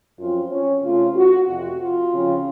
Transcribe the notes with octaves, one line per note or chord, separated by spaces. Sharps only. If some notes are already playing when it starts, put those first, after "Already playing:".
F#2 F3 C4 F4
C#4
C#3 A3 C4 F4
F#4
F2 C3 F3 C4 F#4
F4
C#3 F3 C4